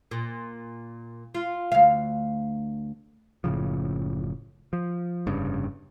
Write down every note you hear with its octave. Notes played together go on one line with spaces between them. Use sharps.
A#2
F4
D2 F5
F#1 A2 C#3 F3
F3
F1 G2 C#3